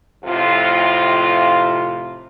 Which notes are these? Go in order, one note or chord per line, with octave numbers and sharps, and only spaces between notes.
F2 A2 C3 F4